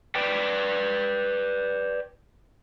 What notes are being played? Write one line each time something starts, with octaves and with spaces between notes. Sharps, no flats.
B4 D5 G5